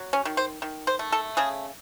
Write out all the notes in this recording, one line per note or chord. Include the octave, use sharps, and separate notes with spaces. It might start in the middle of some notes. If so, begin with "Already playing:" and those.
Already playing: F#3
C#4
D#3
C5
D#3
C5
A3
A4
C#3 G#4